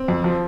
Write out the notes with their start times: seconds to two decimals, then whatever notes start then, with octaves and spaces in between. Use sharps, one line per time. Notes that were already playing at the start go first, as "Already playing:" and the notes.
Already playing: C4
0.08 F2
0.24 F3